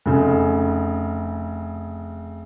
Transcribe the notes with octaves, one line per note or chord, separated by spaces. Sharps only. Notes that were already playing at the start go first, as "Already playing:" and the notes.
F1 C#3